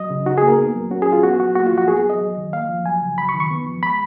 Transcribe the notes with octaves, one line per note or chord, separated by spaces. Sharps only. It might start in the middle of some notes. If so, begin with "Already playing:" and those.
Already playing: F#3 D#5
C#3
D#4 F#4
G#4
A#3
A#4
B3
F#3
C#4 F#4
G#4
F#3
F4
B3 F#4
F#3 F#4
A#3 F#4
F4
F3
F#4
B3 G#4
G#4
F#3
D#5
F#3
D#3
A#3 F5
F3
F#3 G#5
C#3
F#3 B5
C#6
D#3
C#6
B3
F3
G#3 B5